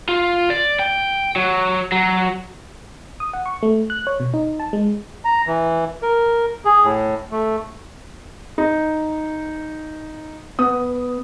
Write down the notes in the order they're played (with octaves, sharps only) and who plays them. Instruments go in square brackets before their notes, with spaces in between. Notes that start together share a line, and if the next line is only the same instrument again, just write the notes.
[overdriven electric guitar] F4
D5
G5
F#3
F#3
[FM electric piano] D#6
F#5
C#6
A3
F#6
C#5
B2
D#4
A5
G#3
[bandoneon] A#5
E3
A#4
G#4
A2
A3
[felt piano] D#4
[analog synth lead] B3 [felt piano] D#6